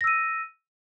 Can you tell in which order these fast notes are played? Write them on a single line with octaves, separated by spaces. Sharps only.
A#6 E6 D#7